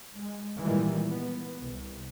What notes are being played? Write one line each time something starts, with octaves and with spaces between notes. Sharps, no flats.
G#3
A#2 D#3 E3 G3 G#3
B3
C2